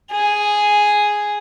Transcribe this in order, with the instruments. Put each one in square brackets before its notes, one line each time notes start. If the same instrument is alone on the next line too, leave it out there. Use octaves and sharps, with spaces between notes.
[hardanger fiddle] G#4